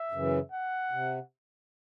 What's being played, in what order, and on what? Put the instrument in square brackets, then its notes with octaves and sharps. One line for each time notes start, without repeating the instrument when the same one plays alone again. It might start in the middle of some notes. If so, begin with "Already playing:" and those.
Already playing: [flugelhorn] E5
[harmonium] F#2 C#3 E3
[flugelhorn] F#5
[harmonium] C3